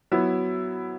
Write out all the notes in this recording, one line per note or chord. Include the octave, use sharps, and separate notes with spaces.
F#3 B3 E4